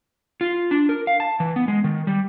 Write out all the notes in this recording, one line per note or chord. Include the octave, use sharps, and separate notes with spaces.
F4
D4
A#4
F5
A5
E3
B3
G#3
D#3
G3